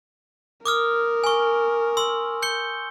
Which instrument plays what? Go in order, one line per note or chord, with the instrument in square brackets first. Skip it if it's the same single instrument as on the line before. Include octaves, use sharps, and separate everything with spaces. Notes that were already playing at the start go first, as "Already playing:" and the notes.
[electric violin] A#4 [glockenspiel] D6 D#6 F6
[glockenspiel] G#5 C#6
C6 E6
G6 C#7 G7